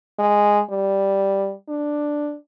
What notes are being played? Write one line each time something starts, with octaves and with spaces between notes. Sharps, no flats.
G#3
G3
D4